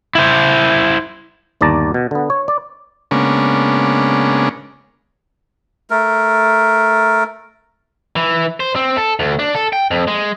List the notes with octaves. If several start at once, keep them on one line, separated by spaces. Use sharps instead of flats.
E4 C5
G1 D#2 D5 A5 A#5
B2
D3 B3
C#5
D5
C#3 G#3 A#3 B3 C#4 D4
A3 A#4
E3
C5
C4
A4
D2
D4
A4
G5
F2
G#3